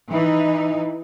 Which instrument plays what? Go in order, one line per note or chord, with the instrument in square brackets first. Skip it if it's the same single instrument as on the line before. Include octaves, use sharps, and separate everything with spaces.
[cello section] E3 D#4